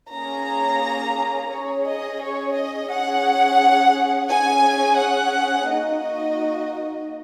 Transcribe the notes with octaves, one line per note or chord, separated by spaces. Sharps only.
A#3 C#4 G#4 A#5
C#4 G#4 C#5
D#5
C#5
D#5
C#4 G#4 F#5
C#4 G#4 G#5
F#5
A#3 D#4 F#4 D#5